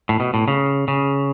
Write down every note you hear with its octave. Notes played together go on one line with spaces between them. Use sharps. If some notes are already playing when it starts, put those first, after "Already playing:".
A2
B2
A2
C#3
C#3